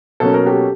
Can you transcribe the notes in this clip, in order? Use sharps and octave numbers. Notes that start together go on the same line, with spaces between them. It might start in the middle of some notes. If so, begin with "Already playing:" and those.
B2 F#3 A#3 C#4 A4
A#4
G4 A4